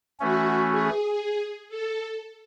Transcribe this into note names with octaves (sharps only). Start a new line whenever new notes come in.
E3 A3 C#4 F#4
G#4
A4